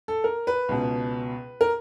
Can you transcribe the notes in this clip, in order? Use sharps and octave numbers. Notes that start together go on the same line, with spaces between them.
A4
A#4
B4
C#2 B2
A#4